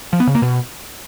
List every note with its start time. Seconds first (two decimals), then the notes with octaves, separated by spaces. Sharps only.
0.13 F3
0.20 B3
0.27 C#3
0.35 A#3
0.42 B2